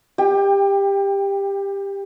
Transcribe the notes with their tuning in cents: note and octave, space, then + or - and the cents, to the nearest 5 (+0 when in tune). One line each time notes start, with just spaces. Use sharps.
G4 +15 G5 +35